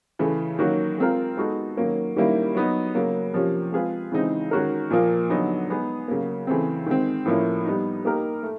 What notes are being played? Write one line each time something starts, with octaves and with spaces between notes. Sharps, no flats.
C#3 E3 A3
D#3 F#3 A#3 C#4 F#4
G#3 C4 F4 A#4
G#3 B3 D#4 F#4 A4
D#3 F#3 A#3 C#4
D#3 G3 A#3 C#4 E4
F#3 B3 D#4
C#3 F#3 A#3
C3 F3 A#3 C#4
G#3 C4 F4 G#4 B4
C#3 E3 G#3 C4 D#4
D#3 G#3 C#4 F#4 A#4
A#2 F3 A#3
D3 F#3 B3 D#4
G#3 B3 D#4 G#4
C#3 F#3 A#3
C#3 E3 A3 C4
D#3 G#3 C4
A2 F3 A#3 C#4 E4
G3 B3 D#4
A#3 D#4 G4 A#4
A3